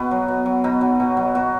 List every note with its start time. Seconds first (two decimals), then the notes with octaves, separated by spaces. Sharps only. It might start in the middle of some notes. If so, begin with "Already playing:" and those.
Already playing: B2 B3
0.11 F#3
0.28 B2
0.46 F#3
0.64 B2 D#4
0.81 F#3
1.00 B2
1.17 F#3
1.35 B2 F#4